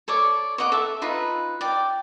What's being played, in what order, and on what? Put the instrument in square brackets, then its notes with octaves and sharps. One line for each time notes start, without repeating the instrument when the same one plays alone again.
[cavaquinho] A4 C#5 D5 D6
C#5 D#5 F#5 D6
A4 E5
D#4 F4 B4
D5 G5